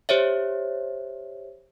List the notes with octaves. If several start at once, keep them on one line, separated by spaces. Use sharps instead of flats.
G4 C5 C#5 E5